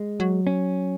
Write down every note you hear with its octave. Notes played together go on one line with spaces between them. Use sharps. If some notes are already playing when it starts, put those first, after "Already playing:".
Already playing: G#3
F#3
C#4